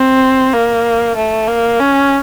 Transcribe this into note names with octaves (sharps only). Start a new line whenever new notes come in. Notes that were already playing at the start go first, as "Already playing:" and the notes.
Already playing: C4
A#3
A3
A#3
C#4